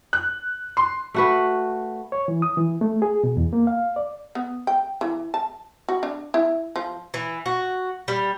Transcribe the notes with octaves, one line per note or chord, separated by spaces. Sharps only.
F#6
C6
A3 F#4 B4
C#5
E3
D#6
E3
A3
G#4
B2
E2
A#3
F5
D5
B3
G5
E3
A5
F#4
D4
E4
F3
E3
F#4
G3